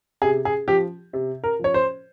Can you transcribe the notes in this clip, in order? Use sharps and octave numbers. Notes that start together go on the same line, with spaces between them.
C3 G#4
G#4
F3 G4
C3
A#4
F3 C#5
C5